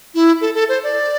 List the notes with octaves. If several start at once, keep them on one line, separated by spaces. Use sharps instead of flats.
E4
A4
A4
C5
D5